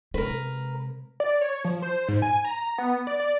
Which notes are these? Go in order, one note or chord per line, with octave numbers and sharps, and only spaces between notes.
C3 G#3 A#4 B4
D5
C#5
F3
C5
G#2
G#5
A#5
B3
D5
D5